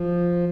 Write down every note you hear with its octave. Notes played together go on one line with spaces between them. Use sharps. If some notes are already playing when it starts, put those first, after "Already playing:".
Already playing: F3